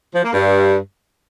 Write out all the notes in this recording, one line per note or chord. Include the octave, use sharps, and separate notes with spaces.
F3
A#3
G2